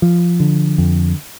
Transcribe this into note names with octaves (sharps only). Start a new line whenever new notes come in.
F3
D3
F2